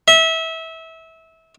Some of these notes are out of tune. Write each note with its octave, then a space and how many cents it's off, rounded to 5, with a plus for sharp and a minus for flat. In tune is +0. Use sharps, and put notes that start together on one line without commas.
E5 -25